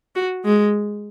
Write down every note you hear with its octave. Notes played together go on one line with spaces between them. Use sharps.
F#4
G#3